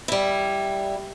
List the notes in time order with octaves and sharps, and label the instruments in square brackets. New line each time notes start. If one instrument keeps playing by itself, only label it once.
[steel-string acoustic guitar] G3 E4